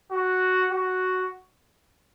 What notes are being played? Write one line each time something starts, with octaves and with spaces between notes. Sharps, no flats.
F#4
F#4